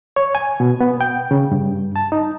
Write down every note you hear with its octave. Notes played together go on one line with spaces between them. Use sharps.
C#5
G#5
B2
B3
G5
C#3
G2
A5
D#4